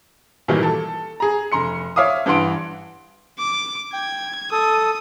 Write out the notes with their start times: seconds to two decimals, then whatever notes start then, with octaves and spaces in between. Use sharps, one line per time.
0.48 A#2 D#3 E3 F#3 G3 A#3
0.63 A4
1.20 G#4 A#5
1.52 F1 A#5 C6 C#7
1.96 C#5 E5 F5 D6 D#6
2.26 G2 E3 D4 F#5 C6 D7
3.39 D6
3.93 G5 G#6
4.52 A4 D#6